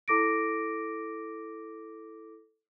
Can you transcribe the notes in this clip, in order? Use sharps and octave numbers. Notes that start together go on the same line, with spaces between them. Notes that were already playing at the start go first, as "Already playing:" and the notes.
E4 A4 D6 A#6 D7